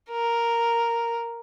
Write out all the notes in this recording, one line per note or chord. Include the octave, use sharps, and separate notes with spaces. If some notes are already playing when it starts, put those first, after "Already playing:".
A#4